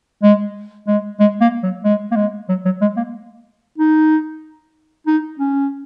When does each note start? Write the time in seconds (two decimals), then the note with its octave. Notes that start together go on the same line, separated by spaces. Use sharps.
0.23 G#3
0.87 G#3
1.20 G#3
1.41 A#3
1.63 F#3
1.84 G#3
2.11 A#3
2.16 G#3
2.49 F#3
2.65 F#3
2.81 G#3
2.97 A#3
3.78 D#4
5.07 D#4
5.39 C#4